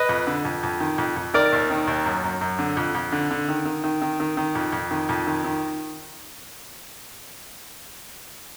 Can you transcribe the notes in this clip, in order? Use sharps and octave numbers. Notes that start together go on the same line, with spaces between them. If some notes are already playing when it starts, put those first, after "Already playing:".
Already playing: B4 D#5
F2
D3
F2
F2
D#3
F2
F2
D#3 A#4 D5
D#2
D#3
D#2
F#2
F#2
F#2
D3
F2
F2
D3
D3
D#3
D#3
D#3
D#3
D#3
D#3
F2
F2
D#3
F2
D#3
D#3